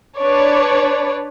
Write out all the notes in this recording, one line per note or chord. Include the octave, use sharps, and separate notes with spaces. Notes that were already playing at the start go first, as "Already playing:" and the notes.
D4 B4 C#5 D5